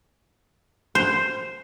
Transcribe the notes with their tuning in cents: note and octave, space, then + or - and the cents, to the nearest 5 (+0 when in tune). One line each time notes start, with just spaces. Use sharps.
C5 +0